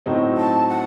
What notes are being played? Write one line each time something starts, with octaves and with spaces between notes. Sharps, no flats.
A2 F#3 C4 D#4
A5
F#5